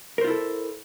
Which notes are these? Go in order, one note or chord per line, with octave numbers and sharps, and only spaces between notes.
E4 F4 A4 A#4 C5